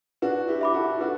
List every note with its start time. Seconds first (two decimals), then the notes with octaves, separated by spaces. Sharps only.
0.22 D4 F#4 B4
0.48 E4 G4
0.61 E5 B5 D6
0.74 F#4 A4
1.00 D4 F#4 B4